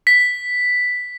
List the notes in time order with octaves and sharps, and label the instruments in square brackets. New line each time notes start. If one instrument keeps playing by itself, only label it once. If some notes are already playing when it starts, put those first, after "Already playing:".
[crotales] B6